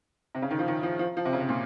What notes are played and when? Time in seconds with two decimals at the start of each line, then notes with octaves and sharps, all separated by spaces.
0.35 C3
0.42 C#3
0.51 D#3
0.59 F3
0.68 D#3
0.83 F3
0.99 F3
1.17 F3
1.25 C3
1.33 C#3
1.41 C3
1.49 A#2